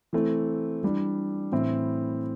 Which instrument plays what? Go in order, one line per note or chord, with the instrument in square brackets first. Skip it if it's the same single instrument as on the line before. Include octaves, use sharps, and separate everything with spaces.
[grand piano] E3 A3 C4
E3 G3 D4
A2 E3 C4 E4